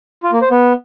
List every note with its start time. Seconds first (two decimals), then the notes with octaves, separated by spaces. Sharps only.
0.23 F4
0.32 A#3
0.42 C5
0.51 B3